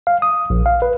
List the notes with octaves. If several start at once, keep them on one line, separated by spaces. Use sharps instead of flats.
F5
D#6
A#1
F5
B4